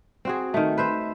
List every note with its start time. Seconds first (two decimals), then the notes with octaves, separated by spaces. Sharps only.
0.25 C4 F#4 G#4
0.54 D#3 A3
0.78 B4 C5 E5